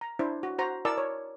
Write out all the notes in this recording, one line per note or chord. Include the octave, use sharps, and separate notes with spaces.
A#5
D4 E4 C5
F#4
F#4 C5 A#5
E4 A#4 D5 A5 E6
C#5